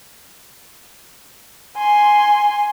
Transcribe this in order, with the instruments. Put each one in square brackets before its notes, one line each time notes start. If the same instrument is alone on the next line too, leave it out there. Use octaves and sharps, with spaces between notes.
[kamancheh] G#5 C6